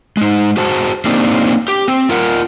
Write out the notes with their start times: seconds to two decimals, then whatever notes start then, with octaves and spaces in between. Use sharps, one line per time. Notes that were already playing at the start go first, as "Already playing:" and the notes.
0.17 G#3 D#4
0.57 F#4 G#4 C5 A5
1.05 A#3 C4 D4 D#4 G4
1.68 G4
1.88 C4
2.09 F4 A#4 F#5